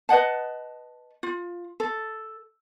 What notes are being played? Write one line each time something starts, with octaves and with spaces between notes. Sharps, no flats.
B4 D#5 F#5 A5
F4
A4